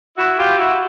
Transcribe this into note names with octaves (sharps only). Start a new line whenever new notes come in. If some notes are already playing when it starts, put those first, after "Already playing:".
E4 F#4
F4 G4
E4 F#4